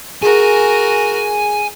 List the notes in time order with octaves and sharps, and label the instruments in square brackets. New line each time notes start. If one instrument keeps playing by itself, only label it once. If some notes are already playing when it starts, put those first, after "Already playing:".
[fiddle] F#4 A#4 [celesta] G#4 [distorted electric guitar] G#5